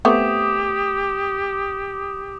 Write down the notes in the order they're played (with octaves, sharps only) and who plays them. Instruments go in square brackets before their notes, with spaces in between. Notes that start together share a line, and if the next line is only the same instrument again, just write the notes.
[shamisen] A3 B3 C4 [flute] G4 [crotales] D6 D#6